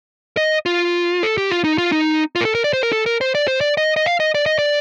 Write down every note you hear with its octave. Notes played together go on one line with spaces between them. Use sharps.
D#5
F4
A4
G4
F4
D#4
F4
D#4
F4
A#4
A4
A#4
D5
C5
A#4
A4
A#4
C5
D5
C5
D5
D#5
D#5
F5
D#5
D5
D#5
D5